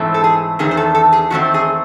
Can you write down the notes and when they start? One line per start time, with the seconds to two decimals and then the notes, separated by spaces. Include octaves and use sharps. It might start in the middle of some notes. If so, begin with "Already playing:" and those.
Already playing: G#2 E3 A3 C4
0.14 A4
0.24 G#4
0.59 E2 D#3 A3 C4 G#4
0.71 C5
0.77 A4
0.95 A4
1.13 G#4
1.30 E2 D#3 A3 C4 F#4
1.54 G#4